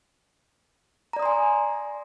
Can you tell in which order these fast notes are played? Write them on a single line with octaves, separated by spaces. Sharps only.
A#5 D5 D#6 C6 G#5